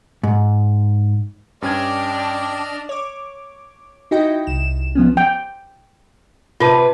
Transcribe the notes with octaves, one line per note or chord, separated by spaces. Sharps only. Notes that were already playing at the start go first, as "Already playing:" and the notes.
G#2
G2 C#4 D4 D5 D#5 G5 F6 G#6
C#5 D6
D#4 E4 F#4 D#5 G5
C2 E7
F3 B3 C#4
G5
C3 F4 B4 A5